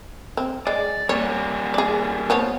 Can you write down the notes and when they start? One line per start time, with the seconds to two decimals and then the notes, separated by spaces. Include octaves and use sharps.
0.37 C4
0.67 G#3 D5
1.09 G3 A#3 C#5
1.74 G#4 D5
2.30 F3 B3 C#5